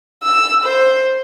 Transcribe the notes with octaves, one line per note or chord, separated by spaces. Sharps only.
E6
C5